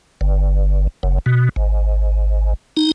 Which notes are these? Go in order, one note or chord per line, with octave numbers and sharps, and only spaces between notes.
G1
F#1
B2
G#1
D#4